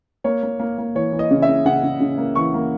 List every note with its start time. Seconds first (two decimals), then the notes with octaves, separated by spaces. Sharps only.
0.24 A#3 C#5
0.43 A#3
0.60 A#3
0.78 A#3
0.95 E3 C#5
1.12 E3
1.19 D#5
1.31 C#3
1.42 E5
1.48 C#3
1.65 C#3 F#5
1.83 C#3
2.00 C#3
2.18 A#3
2.35 E3 C#6
2.54 A#3